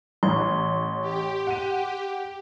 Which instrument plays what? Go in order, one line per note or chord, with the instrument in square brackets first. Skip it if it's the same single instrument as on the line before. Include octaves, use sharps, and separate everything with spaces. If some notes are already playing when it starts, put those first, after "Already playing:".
[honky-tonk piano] A1 C#5 [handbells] C6
[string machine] G4
[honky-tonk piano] F#5 D#7